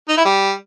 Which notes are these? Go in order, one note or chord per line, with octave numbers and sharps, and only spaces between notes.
D#4
E4
G3